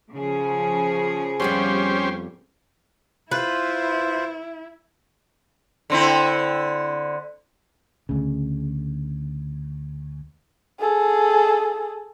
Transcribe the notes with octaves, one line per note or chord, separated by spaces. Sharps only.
C#3 F3 G#4
F2 G3 B3 C#4 G4 C5
E4 F4 B4 C5
D3 C4 E4
D2 C#3
G#4 A4